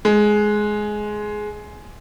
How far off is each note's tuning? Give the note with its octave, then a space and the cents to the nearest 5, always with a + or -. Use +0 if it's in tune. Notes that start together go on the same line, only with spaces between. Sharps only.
G#3 +10